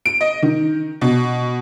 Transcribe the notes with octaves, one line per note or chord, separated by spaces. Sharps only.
D7
D#5
D#3
B2